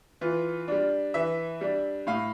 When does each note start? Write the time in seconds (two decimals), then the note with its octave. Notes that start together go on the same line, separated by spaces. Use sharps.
0.21 E3 F4
0.68 G3 D4
1.14 E3 E5
1.61 G3 D4
2.07 A2 F5